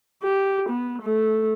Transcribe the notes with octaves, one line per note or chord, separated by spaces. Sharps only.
G4
B3
A3